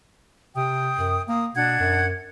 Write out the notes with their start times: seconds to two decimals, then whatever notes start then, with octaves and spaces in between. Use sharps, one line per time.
0.56 C3 G5 D#6
0.99 F#2
1.29 A#3 D#6
1.55 B2 D4 F#5 G#6
1.79 F#2